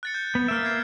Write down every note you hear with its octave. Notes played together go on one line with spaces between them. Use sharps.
F#6 A6 C#7
G6
B3
A#3 E5 F6 G6 D7
G#6 C7